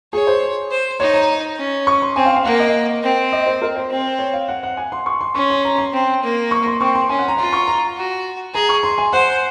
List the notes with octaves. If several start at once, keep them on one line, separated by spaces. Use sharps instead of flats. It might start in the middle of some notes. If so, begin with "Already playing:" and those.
G#4 C#5
C5
C5
D#4 C#5
A#5
C#4
C#6
C6
C4 G#5
F5
F5
A#3 F#5
D#5
C4
D#5
C5
A#4
C5
C4
C#5
F5
F#5
F#5
G#5
C6
C#6
C6
C#4 C#6
C6
A#5
C6
C4
A#3
C#6
C6
C4 C#6
C6
C#4 G#5
F#5
A#5
F4 C6
C#6
A#5
F#4
G#4 A#5
C#6
C6
G#5
C5 F#5